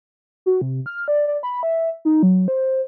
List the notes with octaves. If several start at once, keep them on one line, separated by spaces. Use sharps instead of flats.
F#4
C3
F6
D5
D5
B5
E5
D#4
F#3
C5